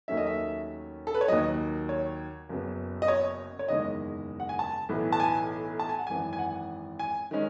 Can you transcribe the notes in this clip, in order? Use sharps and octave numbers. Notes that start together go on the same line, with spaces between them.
D#2 D#3 F#3 A3 C#4 E5
D#5
E5
A4
B4
C#5
D#2 D#3 F#3 D#5
C#5
F#1 F#2 C#3 F#3 B3
D#5
C#5
C#5
F#1 E2 D#3 G#3 D#5
F#5
G#5
A5
B1 A2 E3 B3
A5
G#5
A5
G#5
F#5
G#1 F#2 E3 G#5
G#5
F#5
G#5
D#3 G#3 C#4